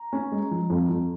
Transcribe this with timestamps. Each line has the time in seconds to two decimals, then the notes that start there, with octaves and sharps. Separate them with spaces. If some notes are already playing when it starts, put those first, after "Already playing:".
Already playing: A#5
0.13 C#4
0.32 G#3
0.51 F3
0.70 F2
0.90 F2